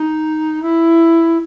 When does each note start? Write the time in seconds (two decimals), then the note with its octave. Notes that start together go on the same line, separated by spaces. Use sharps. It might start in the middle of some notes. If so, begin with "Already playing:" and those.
Already playing: D#4
0.62 E4